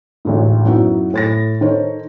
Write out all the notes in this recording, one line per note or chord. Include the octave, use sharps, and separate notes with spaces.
A1 D2 G#2
F#2 F#3 B3 D#4 E4
A2 A6 A#6
D#3 A4 C5 C#5